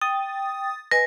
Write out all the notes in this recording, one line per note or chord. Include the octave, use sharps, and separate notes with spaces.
G5 D#6 A6
B4 D#5 G#5 A#6